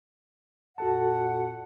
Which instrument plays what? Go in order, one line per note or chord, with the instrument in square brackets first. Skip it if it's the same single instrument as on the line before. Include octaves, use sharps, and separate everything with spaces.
[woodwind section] F2 A#2 F#5 [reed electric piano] F#4 A4 A5